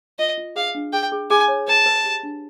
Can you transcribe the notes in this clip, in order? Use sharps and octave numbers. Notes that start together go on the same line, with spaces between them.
F4 D#5
F4
G#4 F5
D4
G#4 G5
G#4
G#4 G#5
C#5
B4 A5
B4
G4
D4